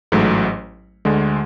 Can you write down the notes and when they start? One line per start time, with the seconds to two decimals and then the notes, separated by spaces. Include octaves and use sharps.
0.12 A1 G#2 F#3 A3
1.05 D2 D3 G#3